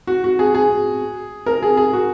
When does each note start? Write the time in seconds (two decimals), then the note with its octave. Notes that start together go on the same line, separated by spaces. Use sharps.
0.07 F#4
0.24 F#4
0.39 G#4
0.55 G#4
1.46 A#4
1.62 G#4
1.77 G#4
1.93 F#4